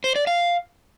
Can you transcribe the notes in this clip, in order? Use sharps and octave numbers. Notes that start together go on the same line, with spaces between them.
C5
D5
F5